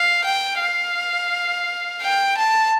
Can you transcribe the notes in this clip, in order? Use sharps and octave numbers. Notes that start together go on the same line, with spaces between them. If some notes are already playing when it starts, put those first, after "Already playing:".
Already playing: F5
G5
F5
G5
A5